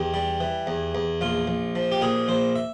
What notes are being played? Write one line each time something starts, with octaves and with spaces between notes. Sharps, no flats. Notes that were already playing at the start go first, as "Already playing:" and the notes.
Already playing: E2 G4
G3
E3
E2
E2
A#1 F4
A#1
F3
G4
A#2 G#4
A#1 C5
E5